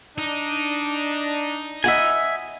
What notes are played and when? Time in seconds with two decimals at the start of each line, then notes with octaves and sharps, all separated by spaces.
0.18 D4 D#4
1.84 D#5 E5 F#5 G#5 B5